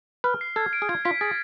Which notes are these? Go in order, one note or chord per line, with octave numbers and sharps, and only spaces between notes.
B4 F6
C7
A4 G#6
D7
G#4
F4 G#6
F4 B6
G#4 A6